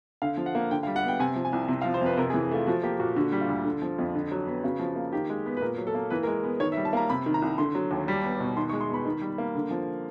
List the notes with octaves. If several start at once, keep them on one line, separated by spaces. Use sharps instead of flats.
D3 F5
F3
F#5
A#3
D3 G5
F5
G3
F#5
B3 G5
C3 G#5
F3
G#5
C2
C3
F5
F3
C5
F2 B4
C3 A#4
G#4
E3
A3 F4
F3 F#4
A#3 G4
A#2 F#4
D3 F#4
G3
F4
D2
D3
F3
F2
D3
F#3
B3
C#3 F#4
F3
A#3
D#3 G4
G#3
B3
B4
A#2 A#4
F#3
A4
A#3
E3 B4
A#4
G#3
B3
D#3 C#5
E5
G3
A5
A#3 A#5
C3 B5
D#3
A#5
C2
D3 C6
F#3
D#2
G3
B3
B2
D#3 C6
C#6
G#3
C6
B3 B5
D#3
G3
A#3
D3
F3